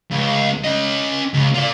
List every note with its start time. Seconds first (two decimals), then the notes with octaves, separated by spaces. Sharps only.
0.11 C#2
0.64 C#4 D#5
1.34 C#2
1.54 F4 D5